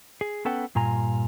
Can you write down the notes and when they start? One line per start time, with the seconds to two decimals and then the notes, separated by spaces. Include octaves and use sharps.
0.21 G#4
0.45 B3 C#4 A4 B4 F#5 G5
0.75 G2 A#2 F4 G#5 A#5